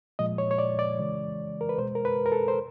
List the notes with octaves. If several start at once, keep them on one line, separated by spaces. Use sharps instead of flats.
A#2 F3 G#3 D#5
C#5
C#5
D5
D5
C#3 E3 G#3
A#4
B4
B2 G#3 C5
A#4
B4
A#4
A4
C5